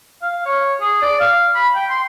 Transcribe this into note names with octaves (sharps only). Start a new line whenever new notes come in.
F5
C#5
G#4
D5
F5
B5
G5
C6